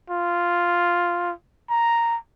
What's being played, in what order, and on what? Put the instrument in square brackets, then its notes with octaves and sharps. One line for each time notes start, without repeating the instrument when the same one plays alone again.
[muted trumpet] F4
A#5